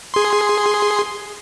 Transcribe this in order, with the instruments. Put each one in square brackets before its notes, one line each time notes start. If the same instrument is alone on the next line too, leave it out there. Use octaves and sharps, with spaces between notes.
[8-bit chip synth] G#4 C6